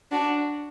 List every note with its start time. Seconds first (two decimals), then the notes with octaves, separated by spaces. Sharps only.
0.11 D4 F#4